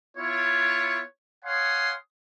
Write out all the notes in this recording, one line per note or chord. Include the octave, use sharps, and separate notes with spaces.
B3 E4 F4 C#5
C#5 F5 F#5 G#5 C6 D#6